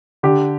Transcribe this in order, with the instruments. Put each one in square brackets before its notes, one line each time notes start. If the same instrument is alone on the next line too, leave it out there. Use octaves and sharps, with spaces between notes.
[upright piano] D3 G4